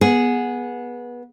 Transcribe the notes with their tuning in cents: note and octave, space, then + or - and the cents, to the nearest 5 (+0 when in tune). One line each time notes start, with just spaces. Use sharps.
B3 -20 G#4 +0